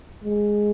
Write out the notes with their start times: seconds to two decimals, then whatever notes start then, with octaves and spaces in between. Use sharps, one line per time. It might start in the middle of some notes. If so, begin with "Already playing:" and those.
0.24 G#3